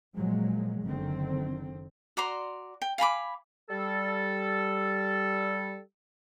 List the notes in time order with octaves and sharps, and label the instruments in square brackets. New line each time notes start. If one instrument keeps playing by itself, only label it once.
[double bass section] A#2 F3 F#3 G#3
F#1 D3 D#3 C4
[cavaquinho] F#4 D5 A#5 C6
G5
F5 G#5 B5 D6
[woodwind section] G3 A4